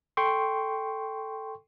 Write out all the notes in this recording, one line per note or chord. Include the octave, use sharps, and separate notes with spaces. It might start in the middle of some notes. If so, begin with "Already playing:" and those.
A4 G5 C6 C#6